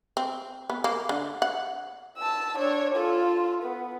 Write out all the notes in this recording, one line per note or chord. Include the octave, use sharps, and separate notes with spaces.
C4
B3
A#3
D3
F#5
A5 E6
D4 C#5
F4 A4
B3